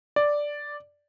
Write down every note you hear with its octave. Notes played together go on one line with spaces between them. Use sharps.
D5